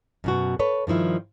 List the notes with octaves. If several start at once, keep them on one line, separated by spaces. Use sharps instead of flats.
F#2 B2 F#4
A4 B4 C#5
G2 D#3 F3 E4